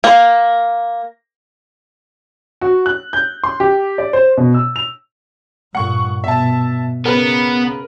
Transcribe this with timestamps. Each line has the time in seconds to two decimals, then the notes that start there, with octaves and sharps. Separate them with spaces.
0.04 A#3
2.61 F#4
2.86 F#6
3.13 G6
3.44 C6
3.60 G4
3.98 D5
4.13 C5
4.38 B2
4.54 E6
4.76 F7
5.75 G2 A#2 F#5 C#6
6.24 B2 E5 A5
7.05 C#3 B3 A#4 B4